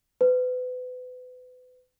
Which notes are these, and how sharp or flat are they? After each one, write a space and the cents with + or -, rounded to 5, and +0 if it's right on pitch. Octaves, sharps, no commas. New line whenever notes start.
B4 +30